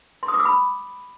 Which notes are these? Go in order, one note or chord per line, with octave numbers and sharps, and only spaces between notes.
C6
D#6
D6
E6
B5